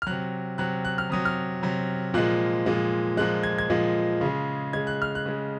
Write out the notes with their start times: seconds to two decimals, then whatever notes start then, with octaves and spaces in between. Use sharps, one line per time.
0.02 F6
0.07 C3 F#3 F#6
0.58 C3 F#3 F#6
0.85 F#6
0.98 F6
1.10 C3 F#3 D#6
1.25 F6
1.63 C3 F#3
2.14 A#2 F3 G#3 F#6
2.66 A#2 F3 G#3
3.17 A#2 F3 G#3 F#6
3.43 G#6
3.58 G#6
3.70 A#2 F3 G#3
4.21 C#3 G#3
4.73 C#3 G#3 G#6
4.87 F#6
5.02 F6
5.15 F#6
5.26 C#3 G#3